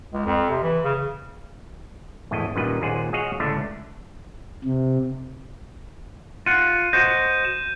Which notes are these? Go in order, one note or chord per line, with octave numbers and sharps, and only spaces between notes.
C#2
F2
C3
E3
C#3
G#1 E2 A2 E4 D#5
F#2 A#2 D#3 G3 B4 D#5
D#2 A#2 G#4 C5 F#5
F#4 G#4 C#5 D#5 F5 F#5
C#2 A2 D3 A3 D4
C3
F4 F#5 D#7
F#4 C5 D#5 G6
E7